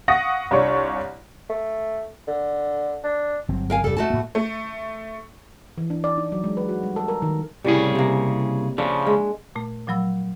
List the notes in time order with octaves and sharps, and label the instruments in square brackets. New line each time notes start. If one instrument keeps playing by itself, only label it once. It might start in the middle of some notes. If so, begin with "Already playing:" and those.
[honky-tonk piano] F5 F#5 C#6 D#6 A#6
C2 D4 F4 C#5 C#6
[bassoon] A3
D3
D4
[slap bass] G1 F#3 C4
[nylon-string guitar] A#4 F5 G#5
[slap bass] F1 F2 [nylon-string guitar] G3 A4
[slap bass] G#2 [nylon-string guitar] A3 F#4 A5
[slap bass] A2 A#3
[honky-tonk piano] A3
[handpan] E3
D4
D5
D#4
F#3
G#3
B4
F#4
G3
A4
A#4
D#3
[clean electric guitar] C2 C#3 G#4 [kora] A2 G3
[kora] C3 A#3
[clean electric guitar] C#3 F3 [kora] D4 E5
[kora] G#3
[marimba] A#2 A3
A#2 F3 F#3 B5 E6